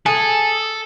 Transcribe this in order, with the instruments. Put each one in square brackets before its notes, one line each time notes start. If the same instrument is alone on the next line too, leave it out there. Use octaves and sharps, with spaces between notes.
[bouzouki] G#4 [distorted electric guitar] A4